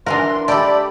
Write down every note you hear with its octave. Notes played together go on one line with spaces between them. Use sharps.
E3 D4 F4 A#4 F#5 C6
A3 G4 A4 D5 B5